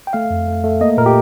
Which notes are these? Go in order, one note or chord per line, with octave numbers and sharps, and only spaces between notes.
G5
A3 F5
F2
A3
A3
A#3 D#5
A#2 A#4
G4